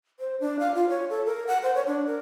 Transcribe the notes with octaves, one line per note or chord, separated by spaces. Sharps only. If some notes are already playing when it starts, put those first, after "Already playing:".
C5
D4
F5
F4
C#5
A4
A#4
F#5
C5
C#5
D4
A#4